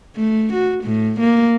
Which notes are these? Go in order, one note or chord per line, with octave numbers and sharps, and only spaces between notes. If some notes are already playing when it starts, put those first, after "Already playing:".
A3
F#4
A2
A#3